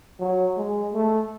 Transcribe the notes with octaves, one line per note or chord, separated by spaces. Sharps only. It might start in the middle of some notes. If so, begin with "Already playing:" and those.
F#3
G#3
A3